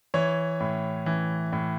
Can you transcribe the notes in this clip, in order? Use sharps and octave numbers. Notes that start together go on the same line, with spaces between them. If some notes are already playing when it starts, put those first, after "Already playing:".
E3 C#5
A2
E3
A2